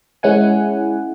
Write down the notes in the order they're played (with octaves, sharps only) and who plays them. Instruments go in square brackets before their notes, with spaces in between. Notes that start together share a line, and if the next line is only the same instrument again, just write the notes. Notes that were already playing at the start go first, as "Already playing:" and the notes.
[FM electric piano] G#3 C#4 E4 F#5 G#5